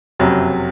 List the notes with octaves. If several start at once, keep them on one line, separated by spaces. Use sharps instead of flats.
F#1 F2 C3 F#3